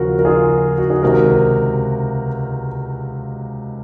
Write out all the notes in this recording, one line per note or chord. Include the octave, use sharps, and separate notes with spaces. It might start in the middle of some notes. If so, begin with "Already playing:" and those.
Already playing: D#2 C#3 F3 F#4 A#4
A#4
F4 G#4
F#4
G#4
C#2 C3 D#3 F#4 A#4